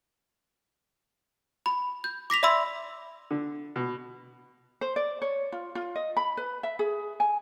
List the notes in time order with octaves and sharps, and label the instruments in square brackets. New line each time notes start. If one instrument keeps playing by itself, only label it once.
[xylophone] B5
G6
D6 A#6 B6 F7
D5 E5 B5 C6 E6
[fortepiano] D3
B2
[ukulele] C5
D5
C#5
F4
F4
D#5
B5
B4
E5
G#4
G#5